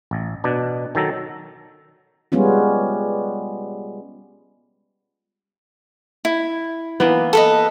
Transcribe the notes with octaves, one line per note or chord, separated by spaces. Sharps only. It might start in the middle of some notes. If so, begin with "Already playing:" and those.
A1
B2 D4
D#3 F#3 A4 A#5
G3 G#3 B3 C#4 F4
E4
E3 A#3 B3
A4 B4 D#5